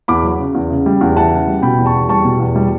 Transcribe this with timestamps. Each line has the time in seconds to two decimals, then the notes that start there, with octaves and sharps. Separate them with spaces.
0.08 E2 B5 D6
0.23 F#3
0.39 C#3
0.55 E2
0.70 C#3
0.86 G3
1.01 E2
1.16 E3 F#5 A5
1.32 C#3
1.48 G3
1.62 B2 G5 B5
1.78 E2
1.86 A5 C#6
1.94 E2
2.09 G3 A5 C#6
2.25 B2
2.40 E2
2.56 G3